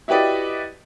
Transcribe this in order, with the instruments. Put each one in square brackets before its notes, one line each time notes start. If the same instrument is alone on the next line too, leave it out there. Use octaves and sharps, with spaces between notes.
[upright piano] E4 F#4 G4 B4 D5 D#5